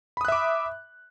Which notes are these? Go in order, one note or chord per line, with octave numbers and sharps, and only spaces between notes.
E5 B5 D6 D#6 F#6